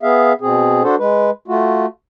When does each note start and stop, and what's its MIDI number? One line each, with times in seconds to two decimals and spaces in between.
0.03 0.33 59
0.03 0.33 68
0.03 0.33 76
0.03 0.33 77
0.41 0.83 47
0.41 0.83 60
0.41 0.83 68
0.83 0.96 62
0.83 0.96 66
0.83 0.96 69
0.83 0.96 72
0.99 1.30 56
0.99 1.30 71
1.48 1.86 57
1.48 1.86 65
1.48 1.86 66